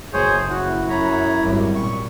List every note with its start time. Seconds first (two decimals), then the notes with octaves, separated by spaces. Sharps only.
0.13 F#1 G#4 C5 C#5
0.49 E4 F#4
0.89 F#2 C#5 A#5 B5
1.41 G#1 F#2 G3
1.75 A#2 C#6